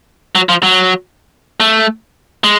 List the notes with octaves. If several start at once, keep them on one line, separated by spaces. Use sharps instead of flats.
F#3
F3
F#3
A3
G#3